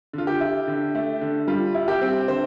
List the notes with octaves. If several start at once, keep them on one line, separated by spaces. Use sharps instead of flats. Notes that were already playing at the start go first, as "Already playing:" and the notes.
D3 F4
G4
E4
D3
A3
D3
G3 F4
E4
G4
C4
D3 C5